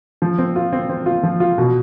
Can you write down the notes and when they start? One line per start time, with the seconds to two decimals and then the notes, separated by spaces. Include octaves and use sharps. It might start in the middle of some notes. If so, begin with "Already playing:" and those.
0.22 F3
0.39 C4
0.56 F4
0.73 C4
0.90 C4
1.06 F4
1.23 F3
1.40 F4
1.58 B2